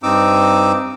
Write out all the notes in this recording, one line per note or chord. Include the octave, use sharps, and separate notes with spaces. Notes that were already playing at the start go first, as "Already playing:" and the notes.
G2 C4 D#4 D6 E6